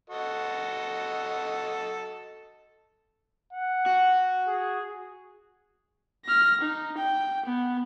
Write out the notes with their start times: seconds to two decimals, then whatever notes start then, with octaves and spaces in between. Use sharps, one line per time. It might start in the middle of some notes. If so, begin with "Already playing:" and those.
0.10 F#4 A4 D#5
3.53 F#5
3.86 F#4
4.47 G#4
6.25 F6 A#6
6.61 D#4
6.97 G5
7.46 B3